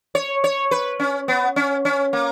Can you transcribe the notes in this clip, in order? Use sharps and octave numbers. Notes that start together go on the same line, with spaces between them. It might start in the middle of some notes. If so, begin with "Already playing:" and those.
C#5
C#5
B4
C#4
B3
C#4
C#4
A#3